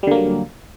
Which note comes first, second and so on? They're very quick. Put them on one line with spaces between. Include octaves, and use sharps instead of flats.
G3 D3 A#3 F#3